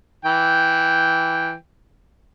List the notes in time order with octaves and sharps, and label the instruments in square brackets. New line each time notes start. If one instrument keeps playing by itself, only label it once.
[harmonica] E3 G5